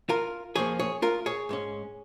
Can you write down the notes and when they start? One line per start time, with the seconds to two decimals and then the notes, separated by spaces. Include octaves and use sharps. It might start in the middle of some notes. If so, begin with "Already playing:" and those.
0.09 F4 A#4
0.56 F2 F3 A#3 C#4 G#4 C#5
0.79 G#4 C#5
1.02 F4 A#4
1.26 G#4 C#5
1.49 G#2 G#3 C#4